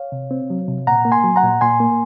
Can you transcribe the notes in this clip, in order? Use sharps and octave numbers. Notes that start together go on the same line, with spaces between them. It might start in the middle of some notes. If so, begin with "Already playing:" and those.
Already playing: C#5 F5
C3
C4
F#3
C3
A#2 F#5 A#5
A#3
G#5 C6
F#3
F#5 A#5
A#2
A#2 G#5 C6
A#3